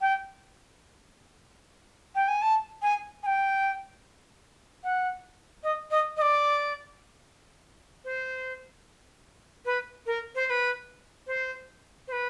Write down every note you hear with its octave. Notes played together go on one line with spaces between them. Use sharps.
G5
G5
G#5
A5
G#5
G#5
G5
F#5
D#5
D#5
D#5
D5
C5
B4
A#4
C5
C5
B4
C5
C5
B4